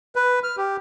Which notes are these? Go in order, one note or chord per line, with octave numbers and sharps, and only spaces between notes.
B4
F6
G4